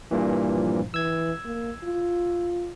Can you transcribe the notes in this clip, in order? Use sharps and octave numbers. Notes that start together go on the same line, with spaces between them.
G2 A#2 E3
F3
E3 E6 G#6
A#3
F4